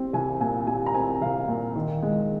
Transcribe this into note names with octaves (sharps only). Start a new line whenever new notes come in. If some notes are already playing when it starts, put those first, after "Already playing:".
Already playing: G3 C4
C2 G#5
A#2 G#5
G3 G#5
A#5
C4 G#5
C2 F5
A#2
D#3
G#3